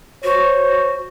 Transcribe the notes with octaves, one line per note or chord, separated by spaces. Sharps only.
F#4 C5 C#5